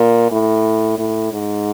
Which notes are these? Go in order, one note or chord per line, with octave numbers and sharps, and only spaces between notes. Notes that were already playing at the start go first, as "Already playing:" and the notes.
Already playing: A#2
A2
A2
G#2